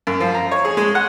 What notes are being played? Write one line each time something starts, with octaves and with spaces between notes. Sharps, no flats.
F#2
F3
A#5
C#5
G#4
G#3
F#5